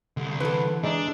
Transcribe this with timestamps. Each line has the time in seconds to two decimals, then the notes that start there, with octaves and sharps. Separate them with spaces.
0.17 C2 D3
0.40 E3 A4 B4
0.84 G#3 D4 D#4 E5